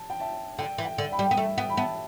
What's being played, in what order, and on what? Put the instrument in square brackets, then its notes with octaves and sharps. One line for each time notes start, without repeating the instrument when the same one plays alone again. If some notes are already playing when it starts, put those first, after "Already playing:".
Already playing: [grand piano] A5
G5
E5 A5
[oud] D3 [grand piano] G5
[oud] E3
[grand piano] G5
[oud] D3
[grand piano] G5 B5
[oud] G3
[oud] B3 [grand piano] G5
[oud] A3 [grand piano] E5
[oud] B3 [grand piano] G5
[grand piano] B5
[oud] B3 [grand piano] E5 A5